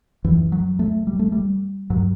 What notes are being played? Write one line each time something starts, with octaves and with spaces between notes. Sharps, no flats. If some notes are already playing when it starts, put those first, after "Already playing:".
F#2 E3
F#3
A3
G3
A3
G3
G2 F#3